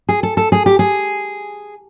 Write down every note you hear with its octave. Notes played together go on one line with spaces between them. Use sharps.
G#4
A4
A4
G#4
G4
G#4